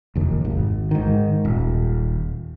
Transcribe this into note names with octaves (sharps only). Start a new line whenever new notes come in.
F1 D#2
G#1
G#2 D#3
D#1